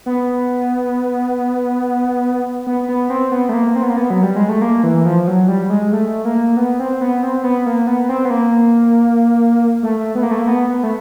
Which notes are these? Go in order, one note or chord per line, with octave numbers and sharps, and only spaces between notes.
B3
B3
B3
C4
B3
A3
A#3
C4
B3
A#3
B3
F#3
G3
G#3
A3
A#3
E3
F3
F#3
G3
G#3
A3
A#3
B3
C4
B3
C4
B3
A#3
B3
C4
B3
A#3
A3
B3
A#3
A3
A#3
B3
B3
A3